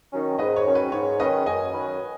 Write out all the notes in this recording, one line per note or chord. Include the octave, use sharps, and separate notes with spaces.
D#3 F#3 C#4
G#2 B4 D#5
C#5
D#3 F#3 C#4
B4
G#2 C#5
D#3 F#3 C#4 B4 D#5
F#2 D#5 G#5
D#3 F#3 C#4 B4